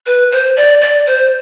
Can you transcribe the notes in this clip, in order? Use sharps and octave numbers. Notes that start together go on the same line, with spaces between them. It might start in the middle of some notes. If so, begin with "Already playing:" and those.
B4
C5
D5
D5
C5